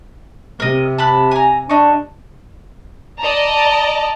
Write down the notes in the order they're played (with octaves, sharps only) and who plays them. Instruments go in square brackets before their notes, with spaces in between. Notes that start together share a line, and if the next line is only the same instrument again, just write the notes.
[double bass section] C3 [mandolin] A#4 D#5
[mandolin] A5 B5 F#6
G#5 A#5
[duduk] D4 [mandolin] D#4 C#6
[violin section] D5 D#5 A5 A#5